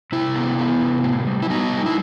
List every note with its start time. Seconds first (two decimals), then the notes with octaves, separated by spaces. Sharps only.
0.12 C3 E4
0.35 B3
0.59 B3
0.81 C3
1.04 A2
1.27 G3
1.42 E4
1.50 B3 D#4
1.73 G3
1.86 E4